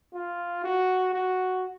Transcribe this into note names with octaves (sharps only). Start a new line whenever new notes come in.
F4
F#4
F#4